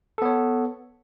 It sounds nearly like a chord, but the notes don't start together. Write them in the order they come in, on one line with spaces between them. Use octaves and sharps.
A4 B3 C#5